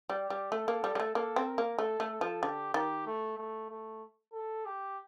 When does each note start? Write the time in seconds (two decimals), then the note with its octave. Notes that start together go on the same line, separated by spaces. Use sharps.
0.10 G3
0.20 G4
0.30 G3
0.52 A3 A4
0.68 A#3
0.84 G3
0.95 G3
1.00 A3
1.15 A#3 A4
1.36 C4
1.47 A#4
1.58 A#3
1.78 A3 A4
2.00 A3
2.11 A4
2.21 F3
2.42 D3 G4
2.74 D#3 G4
3.06 A3
3.38 A3
3.70 A3
4.33 A4
4.65 G4